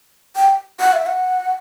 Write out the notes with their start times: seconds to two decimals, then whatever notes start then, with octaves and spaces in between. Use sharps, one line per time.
0.36 G5
0.80 F#5
0.93 E5
1.06 F#5